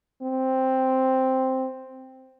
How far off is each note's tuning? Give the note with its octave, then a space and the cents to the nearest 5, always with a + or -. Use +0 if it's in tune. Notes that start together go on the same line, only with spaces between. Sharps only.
C4 +0